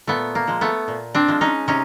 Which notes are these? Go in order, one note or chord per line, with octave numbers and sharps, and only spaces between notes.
A#2 A3 B3
A#3
F3 G#3
A3 B3
A#2
C4 D4
F3 G#3
C#4 D#4
C3 C#4 D#4